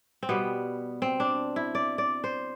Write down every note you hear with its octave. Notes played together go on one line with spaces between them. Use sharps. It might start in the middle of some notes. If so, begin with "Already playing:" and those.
C4
B2 G3 B3
C4
D4
E4
D5
D5
C5